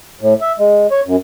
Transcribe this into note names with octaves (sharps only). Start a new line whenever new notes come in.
A2
E5
G#3
C#5
F#2